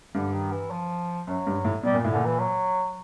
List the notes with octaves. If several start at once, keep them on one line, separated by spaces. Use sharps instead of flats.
G2 D3
D#3
E3
F3
F#2 F#3
G2
A2
B2 G3
A#2
A2
A#2 D3
E3
F#3